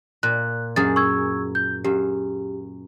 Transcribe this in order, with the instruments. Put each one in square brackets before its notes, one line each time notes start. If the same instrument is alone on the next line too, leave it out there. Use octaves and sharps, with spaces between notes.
[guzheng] A#2 [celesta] F#6
[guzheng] F#2 G#4 [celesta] A6
[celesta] C#6 E6 G#6
G6
[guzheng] F#2 [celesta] G4